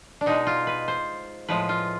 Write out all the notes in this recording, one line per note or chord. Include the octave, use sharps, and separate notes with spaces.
D4
B2 G#3 D#4
F4
B4
C5
A2 F3 G#3 B4
F4